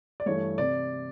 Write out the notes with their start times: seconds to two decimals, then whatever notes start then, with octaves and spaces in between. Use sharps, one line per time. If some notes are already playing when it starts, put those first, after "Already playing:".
0.20 D5
0.26 G2 E3 A3 C#5
0.58 C3 D5